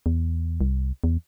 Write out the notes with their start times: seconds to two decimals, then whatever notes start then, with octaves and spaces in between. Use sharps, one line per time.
0.06 E2
0.61 C2
1.04 E2